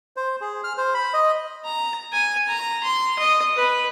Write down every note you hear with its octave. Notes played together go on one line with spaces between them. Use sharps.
C5
G#4
F6
C5
B5
D#5
A#5
G#5
A#5
C6
D#5
B4